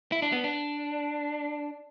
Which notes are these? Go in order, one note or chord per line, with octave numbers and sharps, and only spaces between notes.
E4
D4
B3
D4